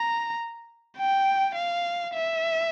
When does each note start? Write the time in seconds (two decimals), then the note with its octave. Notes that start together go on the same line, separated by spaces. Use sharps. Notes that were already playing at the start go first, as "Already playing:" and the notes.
Already playing: A#5
0.98 G5
1.55 F5
2.14 E5